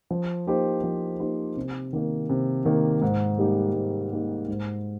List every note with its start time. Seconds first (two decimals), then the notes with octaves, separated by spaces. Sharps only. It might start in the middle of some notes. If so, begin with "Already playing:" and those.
0.10 F3
0.47 A#3 D#4 G4 C5
0.83 F3
1.20 A#3 D#4 G4 C5
1.57 C3
1.93 D#3 A#3
2.30 C3
2.65 D#3 A#3
3.02 G#2
3.38 G3 A#3 D#4 G4
3.74 G#2
4.11 G3 A#3 D#4 G4
4.48 G#2